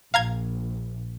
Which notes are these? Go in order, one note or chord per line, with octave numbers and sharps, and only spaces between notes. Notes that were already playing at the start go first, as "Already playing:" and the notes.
A#1 F5 A#5 G#6